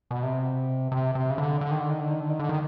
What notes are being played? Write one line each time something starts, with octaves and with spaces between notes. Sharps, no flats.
B2
C3
C3
C3
C#3
D3
D3
D#3
D3
D#3
D3
D#3
D3
D#3
D3
D#3